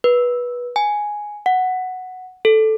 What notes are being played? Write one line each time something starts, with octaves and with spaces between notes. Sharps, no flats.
B4
G#5
F#5
A4